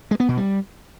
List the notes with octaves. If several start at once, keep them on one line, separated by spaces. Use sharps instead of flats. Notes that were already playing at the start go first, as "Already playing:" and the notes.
G#3
B3
B2
G3